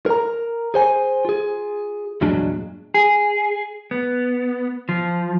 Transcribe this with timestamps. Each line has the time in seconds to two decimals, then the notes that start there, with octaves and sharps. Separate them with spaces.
0.06 A#4 A#5
0.74 G#4 C5 G#5
1.25 F4 G#4
2.21 E2 G2 A#2 F#3 G#3 D4
2.94 G#4
3.91 B3
4.89 F3